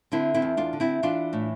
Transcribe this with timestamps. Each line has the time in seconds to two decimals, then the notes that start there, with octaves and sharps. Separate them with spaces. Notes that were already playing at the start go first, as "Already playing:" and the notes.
0.12 D3 C4 E4
0.34 C4 E4
0.42 E2
0.57 D4 F4
0.73 D3
0.80 C4 E4
1.03 E3 D4 F4
1.33 A2